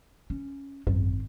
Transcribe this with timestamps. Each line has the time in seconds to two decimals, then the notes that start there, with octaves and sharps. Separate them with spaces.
0.30 C#4
0.87 G#1 F#2 C4